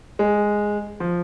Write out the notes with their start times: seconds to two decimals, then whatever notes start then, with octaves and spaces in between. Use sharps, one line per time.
0.19 G#3
1.00 F3